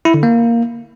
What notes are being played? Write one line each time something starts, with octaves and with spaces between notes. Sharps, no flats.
E4
D3
A#3